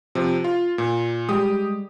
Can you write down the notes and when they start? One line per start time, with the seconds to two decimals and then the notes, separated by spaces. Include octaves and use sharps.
0.15 C3 F3
0.44 F4
0.78 A#2
1.29 G3 G#3 G4 D#6